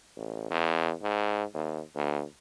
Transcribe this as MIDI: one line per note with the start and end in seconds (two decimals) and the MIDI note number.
0.16 0.48 33
0.51 0.93 40
1.02 1.44 44
1.54 1.81 39
1.95 2.23 38